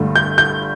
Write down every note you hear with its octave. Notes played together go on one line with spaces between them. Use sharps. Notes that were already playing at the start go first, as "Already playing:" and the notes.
Already playing: G1 G2 D3 A3
G6
G6